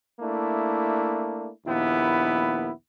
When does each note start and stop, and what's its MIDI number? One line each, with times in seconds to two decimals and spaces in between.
0.20 1.50 57
0.20 1.50 58
0.20 1.50 62
0.20 1.50 64
1.66 2.70 34
1.66 2.70 39
1.66 2.70 59
1.66 2.70 64